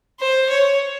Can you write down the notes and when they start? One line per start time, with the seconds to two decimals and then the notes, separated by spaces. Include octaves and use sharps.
0.20 C5
0.50 C#5